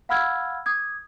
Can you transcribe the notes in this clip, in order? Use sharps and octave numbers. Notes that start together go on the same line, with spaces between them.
F5 F#5 B5 E6 F6 G#6
D6 D#6 G#6